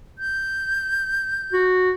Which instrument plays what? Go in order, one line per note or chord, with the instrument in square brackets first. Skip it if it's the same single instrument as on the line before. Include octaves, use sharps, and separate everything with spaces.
[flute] G6
[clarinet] F#4